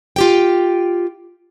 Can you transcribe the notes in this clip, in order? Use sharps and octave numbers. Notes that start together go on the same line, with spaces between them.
F4 G4 G5